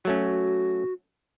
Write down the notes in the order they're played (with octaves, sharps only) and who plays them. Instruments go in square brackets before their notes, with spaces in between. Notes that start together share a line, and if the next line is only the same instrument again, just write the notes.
[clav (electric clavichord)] F#3 A3 C#4 [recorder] F#4